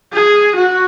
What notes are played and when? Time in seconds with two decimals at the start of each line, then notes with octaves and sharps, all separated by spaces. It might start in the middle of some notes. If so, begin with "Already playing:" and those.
0.13 G#4
0.56 F#4